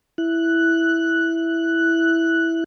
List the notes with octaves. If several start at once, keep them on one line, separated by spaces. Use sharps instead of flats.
E4 F#6